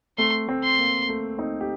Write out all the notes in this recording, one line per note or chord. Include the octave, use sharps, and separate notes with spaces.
A3 C4 C6
A3 C4
C6
A#3
A3
C4 D#4
G4